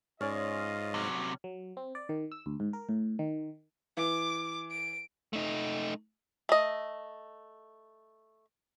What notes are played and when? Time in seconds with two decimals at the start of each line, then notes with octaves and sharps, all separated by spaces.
0.21 G#2 C#4 F4 D5 D#5 G#5
0.94 C3 F#3
1.44 F#3
1.77 C4
1.95 D5
2.09 D#3
2.32 E6
2.46 D2
2.60 G#2
2.73 A#4
2.89 A2
3.19 D#3
3.97 E3 D6
4.71 D7
5.33 A3 D#4
6.49 A3 D#5